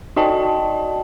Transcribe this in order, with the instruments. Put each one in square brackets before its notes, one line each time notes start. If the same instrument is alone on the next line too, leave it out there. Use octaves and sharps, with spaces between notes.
[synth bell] D#4 F#4 D5 D#5 G5 A5